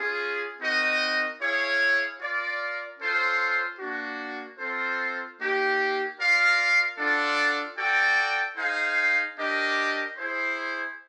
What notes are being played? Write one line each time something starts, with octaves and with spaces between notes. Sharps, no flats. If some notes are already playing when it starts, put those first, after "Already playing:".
Already playing: C#4 F4 G#4
C4 D#4 F#4 A#4 D#5
E4 G#4 C#5 F5
F4 A#4 D5
C#4 F4 A4 C5
A#3 D4 F#4
C4 F4 A4 C5
A#3 D#4 G4
F4 A#4 D5 F5
D4 F4 A4 D5 F#5
F#4 A4 D5 G5
D#4 G#4 C5 F5
D4 G4 A#4 D#5
E4 G#4 C5